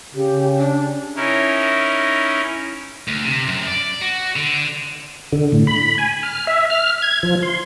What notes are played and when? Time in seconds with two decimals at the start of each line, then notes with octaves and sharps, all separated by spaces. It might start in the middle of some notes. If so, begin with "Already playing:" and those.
0.14 C#3 G4
0.57 D4
1.16 C#4 D#4 E4 A#4
3.08 D2
3.24 C3
3.47 F#2
3.67 D5
4.01 F#4
4.36 D3
5.32 D3
5.52 A2
5.67 B5
5.98 G#5
6.23 F6
6.47 E5
6.70 F6
7.02 G#6
7.23 F3
7.42 C6